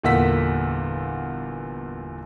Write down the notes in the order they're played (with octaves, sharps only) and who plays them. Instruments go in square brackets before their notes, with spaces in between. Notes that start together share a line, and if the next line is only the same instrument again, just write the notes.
[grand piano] G1 E2 A#2 F#5 E6 B6